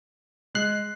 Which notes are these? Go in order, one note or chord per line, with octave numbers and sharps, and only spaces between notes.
G#3 F#6 C7 F#7